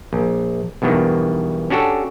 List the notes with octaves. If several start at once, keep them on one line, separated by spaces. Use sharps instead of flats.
A#1
B1 E2 G2 B2 D#3
C#4 D4 F#4 G4 A4